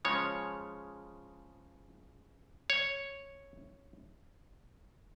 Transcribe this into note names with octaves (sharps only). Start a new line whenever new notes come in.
C#3 F3 G#3 C#5
C#5